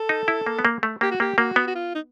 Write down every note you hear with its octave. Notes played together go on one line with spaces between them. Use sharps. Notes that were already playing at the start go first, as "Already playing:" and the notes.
Already playing: A4
D#4
E4
A#3
B3
A#3
A3
A#3 G4
F#4
A#3 G4
A#3 F#4
B3
F#4
F4
D#4